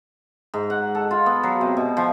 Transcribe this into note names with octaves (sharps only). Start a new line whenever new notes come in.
G#2
F#5
A4
F4
B3
F#3
C3
B2
F3